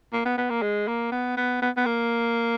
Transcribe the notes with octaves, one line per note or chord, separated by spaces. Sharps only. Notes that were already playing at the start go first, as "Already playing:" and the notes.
A#3
B3
B3
A#3
G#3
A#3
B3
B3
B3
B3
A#3